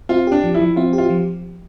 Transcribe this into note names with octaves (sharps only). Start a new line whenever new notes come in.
C4 F4
D4 G4
F3
E4
F3
C4 F4
G4
F4
F3